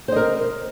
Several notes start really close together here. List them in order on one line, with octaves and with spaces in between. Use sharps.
C5 D#5 A#4